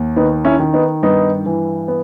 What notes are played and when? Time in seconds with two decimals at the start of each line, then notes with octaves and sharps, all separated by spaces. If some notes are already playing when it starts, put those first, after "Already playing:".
Already playing: D#2
0.16 D#3 B3 D#4
0.45 C#4 E4
0.60 D#3
0.73 B3 D#4
1.03 G2 B3 D#4
1.46 E3
1.88 B3